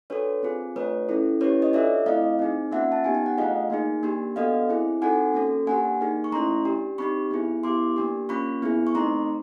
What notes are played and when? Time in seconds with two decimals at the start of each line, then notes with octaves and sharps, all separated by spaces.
0.10 D4 F#4 A4 B4 C#5
0.43 C4 F4 G#4
0.76 A3 D4 F4 B4 C#5
1.09 C#4 E4 A4
1.41 C#4 E4 G4 B4 C#5
1.62 C#5 D#5
1.73 D4 F4 A4 D5 E5
2.06 A3 C4 E4 D#5 F5
2.39 C4 D#4 G#4
2.72 A#3 C#4 F4 E5 F#5
2.92 A5
3.04 B3 D#4 G4 G#5
3.15 G5
3.26 F#5
3.38 A3 D4 F4 G#4 D#5 F5
3.70 A#3 D#4 G#4
4.03 A#3 D4 G4
4.36 B3 D4 F#4 A4 D#5 F5
4.69 C4 E4 G#4
5.02 C4 D#4 F#4 A4 F#5 G#5
5.34 A#3 C#4 F#4 A4
5.67 A#3 D4 G4 F#5 G#5
6.01 A#3 D#4 G#4
6.24 C#6
6.32 A3 C#4 E4 A#5 C6
6.65 D4 G4
6.98 C4 D#4 G4 B5 C#6
7.31 B3 E4 G#4
7.63 B3 E4 G4 C6 D6
7.96 A#3 D4 G4
8.29 A#3 C#4 F4 B5 C#6
8.62 B3 E4 G#4
8.87 C#6
8.95 A3 C4 D#4 A#5 C6